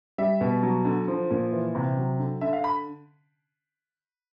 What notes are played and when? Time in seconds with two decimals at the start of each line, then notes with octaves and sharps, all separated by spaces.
0.18 G3 E5
0.41 B2
0.63 F#3
0.85 D3
1.08 F3
1.31 A#2
1.52 E3
1.75 C3
1.97 F#3
2.19 D3
2.41 D3 E5
2.53 F5
2.64 B5